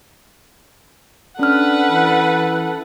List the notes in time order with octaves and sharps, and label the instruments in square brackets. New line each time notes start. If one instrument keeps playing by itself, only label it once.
[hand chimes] C#4 F6 [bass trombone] D4 [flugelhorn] A4 [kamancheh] B4 F#5
[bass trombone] E3